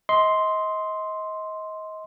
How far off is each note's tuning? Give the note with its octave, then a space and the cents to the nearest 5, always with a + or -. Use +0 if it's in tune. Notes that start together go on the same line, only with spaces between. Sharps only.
D#5 +30 C6 +0